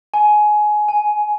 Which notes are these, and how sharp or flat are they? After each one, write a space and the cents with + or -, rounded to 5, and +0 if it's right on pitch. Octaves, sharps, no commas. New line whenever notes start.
G#5 +20
G#5 +0